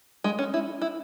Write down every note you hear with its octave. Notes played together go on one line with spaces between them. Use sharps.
G#3
C#4
E4
E4